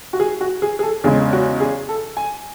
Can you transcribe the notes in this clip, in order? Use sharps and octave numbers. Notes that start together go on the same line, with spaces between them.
F#4
G#4
F#4
G#4
G#4
A4
E2 C#3 G#3 G#4
F#4
G#4
A4
G#5